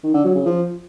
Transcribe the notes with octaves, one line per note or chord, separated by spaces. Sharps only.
D#3
D3
F#3
C#3
F3